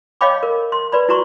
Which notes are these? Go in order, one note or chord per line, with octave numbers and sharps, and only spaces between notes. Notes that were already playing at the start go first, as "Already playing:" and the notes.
C#5 D#5 F5 G5 B5 D6
A#4
C6
B4 D5 B5
E4 F#4 A#5 C6 C#6